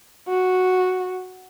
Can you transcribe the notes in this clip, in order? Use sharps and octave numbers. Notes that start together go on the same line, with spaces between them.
F#4